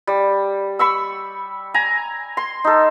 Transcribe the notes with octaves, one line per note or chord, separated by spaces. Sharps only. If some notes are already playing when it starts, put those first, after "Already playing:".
G3
B5 C#6 E6
G#5 A#5
C6
D#4 A4